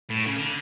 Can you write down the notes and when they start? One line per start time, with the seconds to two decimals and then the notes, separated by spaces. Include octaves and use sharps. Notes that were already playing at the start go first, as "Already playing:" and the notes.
0.10 A2
0.27 C#3
0.37 D3